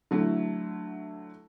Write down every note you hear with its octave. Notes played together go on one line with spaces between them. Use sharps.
D3 F#3 A3 E4